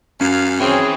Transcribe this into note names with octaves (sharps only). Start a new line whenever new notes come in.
F#2 C#4 F5
C4 C#4 E4 G#4 G5 G#5